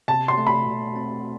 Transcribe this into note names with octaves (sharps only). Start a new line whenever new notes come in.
C3 A5
C6
A3
B5
B2
C4